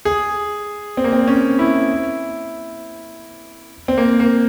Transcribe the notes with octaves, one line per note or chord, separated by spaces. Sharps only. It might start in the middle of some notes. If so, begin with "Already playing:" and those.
G#4
C4
A#3
C4
C#4
E4
C4
A#3
A#3